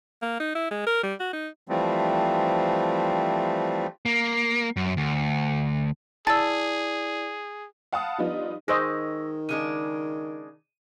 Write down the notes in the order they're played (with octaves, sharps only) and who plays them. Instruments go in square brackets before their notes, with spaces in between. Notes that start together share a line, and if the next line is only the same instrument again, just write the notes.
[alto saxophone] A#3
D#4
E4
G#3
A#4
G3
F#4
D#4
[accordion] E3 F3 G3 A3 C4
[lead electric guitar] A#3
F#2
D2
[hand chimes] E4 D5 [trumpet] G#4 [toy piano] A5 [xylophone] E6 A6
[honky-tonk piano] F5 F#5 A5 B5 D#6
F3 G3 B3 D4 D#4 F4
[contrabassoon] D#3 [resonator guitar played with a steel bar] G#3 [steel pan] G#4 C5 D#5 [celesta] C#6 E6 A#6
[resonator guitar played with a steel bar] C#3 G#3 D4 [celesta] D#7